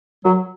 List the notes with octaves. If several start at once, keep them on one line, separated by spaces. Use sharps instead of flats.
F#3